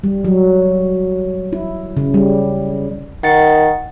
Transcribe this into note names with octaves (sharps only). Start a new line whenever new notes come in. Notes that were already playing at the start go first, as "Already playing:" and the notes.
G3
F#3
E4
C#3
G3
D#3 F#5 A6 C#7